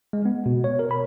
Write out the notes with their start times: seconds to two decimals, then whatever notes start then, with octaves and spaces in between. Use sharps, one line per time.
0.13 G#3
0.25 B3
0.46 B2
0.64 C#5
0.79 A#4
0.91 B5